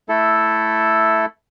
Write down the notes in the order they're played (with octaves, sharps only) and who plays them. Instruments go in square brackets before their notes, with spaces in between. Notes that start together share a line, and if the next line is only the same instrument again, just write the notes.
[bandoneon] A3 E4 A4